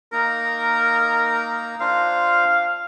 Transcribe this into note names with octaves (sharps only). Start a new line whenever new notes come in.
A#3 D#4 A#4 A#5
D4 F4 C5 F5